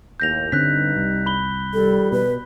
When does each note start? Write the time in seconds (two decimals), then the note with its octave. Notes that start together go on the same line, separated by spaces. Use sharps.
0.20 D#2 A2 G6 A#6 F7
0.52 G2 D3 C4 C#4 D#4 F#6 B6
0.96 C2
1.26 B5 G7
1.74 D#3 F3 G3 A4
2.12 B2 B4